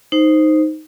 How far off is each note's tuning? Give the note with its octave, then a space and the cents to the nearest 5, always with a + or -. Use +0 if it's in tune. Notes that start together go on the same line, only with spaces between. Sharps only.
D#4 +0 C5 +0